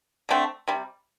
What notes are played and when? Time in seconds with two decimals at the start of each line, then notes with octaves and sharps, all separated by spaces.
0.29 D3 A3 C4
0.68 C3 G3